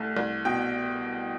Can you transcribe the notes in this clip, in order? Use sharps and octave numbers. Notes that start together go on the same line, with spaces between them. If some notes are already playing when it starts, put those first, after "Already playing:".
Already playing: C2 A3
C2
B2 G5